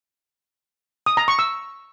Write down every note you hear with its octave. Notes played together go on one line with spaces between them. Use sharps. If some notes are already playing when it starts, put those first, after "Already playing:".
D#6
A#5
C#6
E6